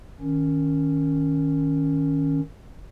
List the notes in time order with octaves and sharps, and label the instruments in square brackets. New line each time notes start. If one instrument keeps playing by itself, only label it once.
[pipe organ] D#3 C#4